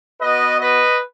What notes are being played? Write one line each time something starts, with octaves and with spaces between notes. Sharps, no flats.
B3 F#4 B4 D#5
B4 D#5